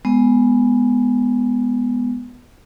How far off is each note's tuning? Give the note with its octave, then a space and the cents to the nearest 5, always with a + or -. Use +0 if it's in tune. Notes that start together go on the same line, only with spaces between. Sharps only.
G#3 +0 B3 +0